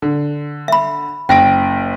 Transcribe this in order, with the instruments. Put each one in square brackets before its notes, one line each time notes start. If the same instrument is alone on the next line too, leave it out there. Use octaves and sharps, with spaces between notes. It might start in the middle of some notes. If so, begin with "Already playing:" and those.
[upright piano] D3
[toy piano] E5 B5
[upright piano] F#1 A#6 D7 [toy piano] G5